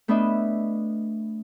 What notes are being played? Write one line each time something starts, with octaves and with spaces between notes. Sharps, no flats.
A3 B3 D4 B4 D#5 E5